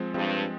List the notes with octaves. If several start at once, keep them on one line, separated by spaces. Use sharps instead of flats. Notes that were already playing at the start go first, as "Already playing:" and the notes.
Already playing: F3 G#3 C4
G2 F3 G#3 C4